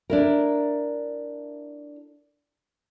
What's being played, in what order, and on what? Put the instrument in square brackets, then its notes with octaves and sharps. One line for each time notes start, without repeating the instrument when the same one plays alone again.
[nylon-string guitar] D4 E4 A#4